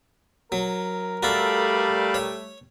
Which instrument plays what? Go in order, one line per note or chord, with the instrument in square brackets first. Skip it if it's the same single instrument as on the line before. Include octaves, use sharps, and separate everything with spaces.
[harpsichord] F#3 [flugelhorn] A#4
[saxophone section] G3 A3 [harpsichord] F#4 A4 [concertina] D5 F5 B5
[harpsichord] C#5